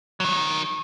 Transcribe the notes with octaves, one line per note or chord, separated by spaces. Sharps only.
D#3 F#3